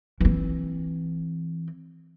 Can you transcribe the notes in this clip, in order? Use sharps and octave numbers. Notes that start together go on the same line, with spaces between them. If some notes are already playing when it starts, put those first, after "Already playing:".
E3 C4